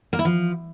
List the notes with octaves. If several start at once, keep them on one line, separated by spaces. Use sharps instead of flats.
A#3
E4
F3